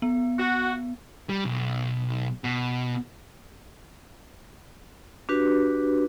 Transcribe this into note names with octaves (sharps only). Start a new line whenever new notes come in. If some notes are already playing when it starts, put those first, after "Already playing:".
B3
F#4
G3
B1
B2
D4 F#4 G4 B4